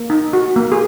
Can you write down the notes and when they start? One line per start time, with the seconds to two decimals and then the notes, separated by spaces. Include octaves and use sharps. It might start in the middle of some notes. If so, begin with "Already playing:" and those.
Already playing: A#3
0.10 D#4
0.33 F#4
0.56 A#3
0.72 G#4